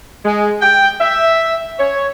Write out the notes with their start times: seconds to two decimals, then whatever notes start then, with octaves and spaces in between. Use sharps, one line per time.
0.25 G#3
0.61 G5
1.01 E5
1.78 C#5